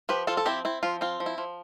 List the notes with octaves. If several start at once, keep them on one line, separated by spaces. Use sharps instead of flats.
F3 G4 B4
F3 F4 A4
A4
C4 E4 G4
C4 E4
F3 F4
C4 F4
F3
E4
F3